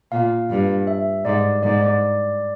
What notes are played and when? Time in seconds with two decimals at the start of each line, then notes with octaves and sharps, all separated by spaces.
0.12 A#2 F5
0.50 G2
0.87 E5
1.25 G#2 D5
1.63 G#2 D5
1.81 D5